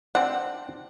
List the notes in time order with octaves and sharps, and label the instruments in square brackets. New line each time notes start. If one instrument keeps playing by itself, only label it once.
[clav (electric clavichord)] C4 D4 [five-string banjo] F#5